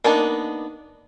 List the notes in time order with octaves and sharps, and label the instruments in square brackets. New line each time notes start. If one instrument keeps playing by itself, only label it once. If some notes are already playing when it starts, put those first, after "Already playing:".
[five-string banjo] A#3 B3 D4 D#4